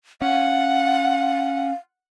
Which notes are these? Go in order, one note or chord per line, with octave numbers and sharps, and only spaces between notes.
C#4 F5 F#5